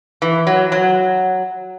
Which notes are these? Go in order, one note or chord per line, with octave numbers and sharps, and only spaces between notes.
E3
F#3
F#3